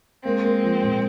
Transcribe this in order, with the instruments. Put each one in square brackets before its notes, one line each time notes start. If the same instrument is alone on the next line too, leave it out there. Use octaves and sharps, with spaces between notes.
[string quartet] G#3 C4 [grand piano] A#3
[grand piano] A#3
F3
A#2